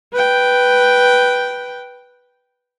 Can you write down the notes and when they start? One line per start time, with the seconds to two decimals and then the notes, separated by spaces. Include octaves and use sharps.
0.13 B4 G5